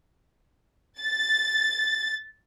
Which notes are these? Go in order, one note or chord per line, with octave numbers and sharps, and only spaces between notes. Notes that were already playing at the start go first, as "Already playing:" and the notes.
A6